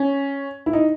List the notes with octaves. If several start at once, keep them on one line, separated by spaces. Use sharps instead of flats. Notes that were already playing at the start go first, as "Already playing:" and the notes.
Already playing: C#4
E4
D#4